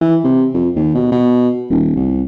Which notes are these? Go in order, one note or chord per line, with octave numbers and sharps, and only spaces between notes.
E3
C3
F2
D#2
B2
B2
D#1
C2